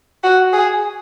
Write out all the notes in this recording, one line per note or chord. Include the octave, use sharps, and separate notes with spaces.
F#4
G#4